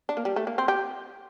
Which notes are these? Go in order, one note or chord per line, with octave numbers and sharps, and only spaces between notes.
D4
A#3
G3
A3
A#3
C4
G4